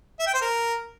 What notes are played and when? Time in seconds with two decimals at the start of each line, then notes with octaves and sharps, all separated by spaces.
0.19 E5
0.27 G5
0.34 C5
0.41 A#4